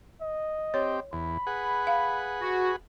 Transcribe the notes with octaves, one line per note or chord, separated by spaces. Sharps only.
D#5
C4 G4 C#5
E2 B5
G#4 B4 F#5
F5
F#4